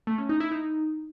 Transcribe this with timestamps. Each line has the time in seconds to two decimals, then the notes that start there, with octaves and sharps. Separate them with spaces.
0.07 A3
0.18 C#4
0.29 D#4
0.40 E4
0.51 D#4